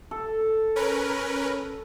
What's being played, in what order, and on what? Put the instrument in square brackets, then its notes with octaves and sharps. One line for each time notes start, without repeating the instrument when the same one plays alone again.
[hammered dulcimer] A4
[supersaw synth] C#4 A#4 B4